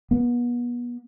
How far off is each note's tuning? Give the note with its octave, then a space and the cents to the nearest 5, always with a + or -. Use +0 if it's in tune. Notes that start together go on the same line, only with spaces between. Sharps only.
B3 -35